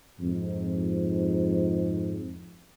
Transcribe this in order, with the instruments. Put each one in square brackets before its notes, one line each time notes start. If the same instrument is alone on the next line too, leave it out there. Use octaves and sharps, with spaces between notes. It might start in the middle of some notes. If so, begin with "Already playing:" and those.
[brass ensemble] F2 G#2